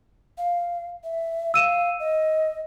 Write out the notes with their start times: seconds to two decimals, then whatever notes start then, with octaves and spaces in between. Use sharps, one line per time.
0.38 F5
1.04 E5
1.54 F5 E6 D#7 E7
2.00 D#5